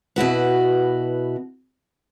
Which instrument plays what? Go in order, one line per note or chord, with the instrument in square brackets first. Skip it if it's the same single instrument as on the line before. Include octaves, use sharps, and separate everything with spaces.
[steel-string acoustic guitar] B2 E4 F#4 B4